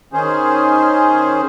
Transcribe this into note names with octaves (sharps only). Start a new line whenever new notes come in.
D#3 C#4 G#4 C5